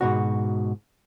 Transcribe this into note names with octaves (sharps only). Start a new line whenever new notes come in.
G#2 B2 F#4